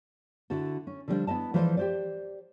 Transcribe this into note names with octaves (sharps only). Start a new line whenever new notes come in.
D3 E4 F#4 A4
C#4
D3 F3 G3 C#4 D4 C5
B3 E4 D#5 A5
E3 F3 G#3 A4 C5 D5
G4 C5 D5